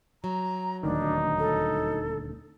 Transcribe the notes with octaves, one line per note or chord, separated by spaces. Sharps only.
F#3 A#5
D#1 D2 D#3 D4 D#4
A4